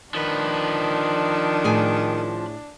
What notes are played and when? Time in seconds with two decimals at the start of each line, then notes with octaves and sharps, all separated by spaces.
0.15 D#3 F3 D4 B4
1.64 A2 G#4 G#5